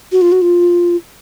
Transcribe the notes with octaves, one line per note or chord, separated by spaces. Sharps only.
F#4
F4
F#4
F4